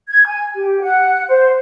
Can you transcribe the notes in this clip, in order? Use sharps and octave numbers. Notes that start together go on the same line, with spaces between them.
G#6
G#5
G4
F#5
C5